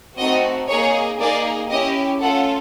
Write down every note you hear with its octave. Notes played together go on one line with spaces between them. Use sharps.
A3 C4 D#4 F#4 D#5
A#3 D#4 G#4 C#5
A#3 D#4 G#4 D5
C#4 E4 G4 D#5
A3 C#4 F4 A4 F#5